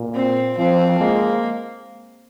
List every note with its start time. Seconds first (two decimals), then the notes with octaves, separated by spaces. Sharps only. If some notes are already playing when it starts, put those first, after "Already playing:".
Already playing: A#2
0.14 C4
0.57 F3 C4
1.00 G#3 A#3